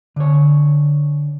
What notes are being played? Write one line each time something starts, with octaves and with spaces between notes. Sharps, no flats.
D3 C#5